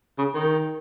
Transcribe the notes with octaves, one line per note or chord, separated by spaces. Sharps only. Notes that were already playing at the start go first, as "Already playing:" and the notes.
C#3
D#3